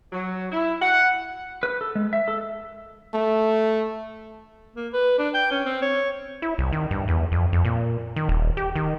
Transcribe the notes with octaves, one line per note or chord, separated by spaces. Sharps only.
F#3
E4
F#5
B4
A4
G#3
E5
A4
A3
A#3
B4
D4
G5
C#4
C4
C#5
E4
C2
D#3
G2
E2
F2
F2
A#2
D#3
D#1
G4
D#3